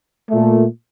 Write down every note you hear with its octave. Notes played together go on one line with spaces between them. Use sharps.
A#2 A3